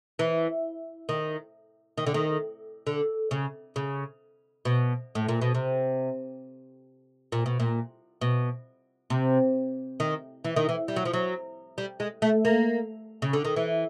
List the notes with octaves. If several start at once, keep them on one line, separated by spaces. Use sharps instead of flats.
E3
D#3
D#3
D3
D#3
D3
C#3
C#3
B2
A2
A#2
B2
C3
A#2
B2
A#2
B2
C3
D#3
E3
D#3
E3
G3
F#3
F3
F#3
G3
G#3
A3
A#3
C#3
D3
D#3
E3